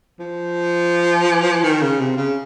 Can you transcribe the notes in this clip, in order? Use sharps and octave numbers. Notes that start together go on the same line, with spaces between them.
F3
D#3
C#3
C3
C#3